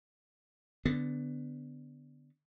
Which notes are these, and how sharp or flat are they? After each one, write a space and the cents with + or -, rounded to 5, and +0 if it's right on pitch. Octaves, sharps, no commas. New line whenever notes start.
D3 +0 B3 +20